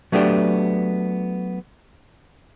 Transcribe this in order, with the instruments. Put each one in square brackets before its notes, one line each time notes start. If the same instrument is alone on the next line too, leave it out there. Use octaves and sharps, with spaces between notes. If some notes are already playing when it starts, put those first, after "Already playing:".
[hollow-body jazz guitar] F#3 A3 B3 D4 G4